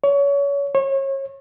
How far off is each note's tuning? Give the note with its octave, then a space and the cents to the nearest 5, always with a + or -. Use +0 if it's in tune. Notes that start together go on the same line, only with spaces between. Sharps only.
C#5 +30
C#5 -30